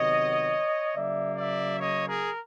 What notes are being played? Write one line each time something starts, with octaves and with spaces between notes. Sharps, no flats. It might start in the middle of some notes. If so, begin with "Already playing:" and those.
Already playing: C3 D#3 F#3 B3 C#5 D#5
C#3 F#3 A#3 D5 E5
D5 E5
C#5 D#5
G#4 A#4